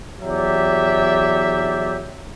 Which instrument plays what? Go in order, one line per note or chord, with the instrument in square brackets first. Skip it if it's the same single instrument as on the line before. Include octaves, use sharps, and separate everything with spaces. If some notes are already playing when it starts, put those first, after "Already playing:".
[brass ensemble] E2 F#3 G4 D5 E5